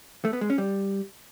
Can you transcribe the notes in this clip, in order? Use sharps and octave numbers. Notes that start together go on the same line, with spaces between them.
A3
B3
G#3
C#4
G3